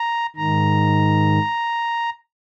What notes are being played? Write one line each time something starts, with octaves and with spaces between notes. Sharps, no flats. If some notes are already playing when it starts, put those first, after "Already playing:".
Already playing: A#5
G#2 D#3 A#5